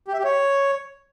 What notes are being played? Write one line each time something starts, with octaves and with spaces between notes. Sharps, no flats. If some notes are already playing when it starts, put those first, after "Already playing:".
G4
E5
G4
C#5